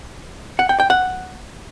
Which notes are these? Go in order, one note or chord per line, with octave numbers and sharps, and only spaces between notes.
F#5
G5
G5
F#5